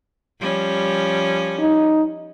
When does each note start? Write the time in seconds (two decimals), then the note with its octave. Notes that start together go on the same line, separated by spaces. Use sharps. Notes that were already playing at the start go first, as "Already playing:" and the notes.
0.40 F3 G3 C#4
1.60 D#4